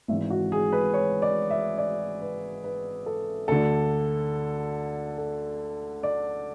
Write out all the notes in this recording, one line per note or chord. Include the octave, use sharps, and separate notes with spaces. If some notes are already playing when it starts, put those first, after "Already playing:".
G#1 G#2 E3 E5
F#4
G#4
B4
C#5
D5
E5
D5
B4
B4
A4
D2 D3 A4
A4
D5